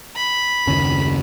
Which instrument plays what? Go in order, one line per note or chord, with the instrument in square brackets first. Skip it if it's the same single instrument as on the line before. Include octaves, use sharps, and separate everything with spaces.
[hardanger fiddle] B5
[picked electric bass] F#1 D#2 C#3